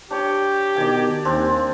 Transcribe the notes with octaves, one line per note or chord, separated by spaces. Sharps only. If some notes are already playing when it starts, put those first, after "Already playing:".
D4 G4 C#5
B2 D#3 D5 G#5
D#2 C4 D4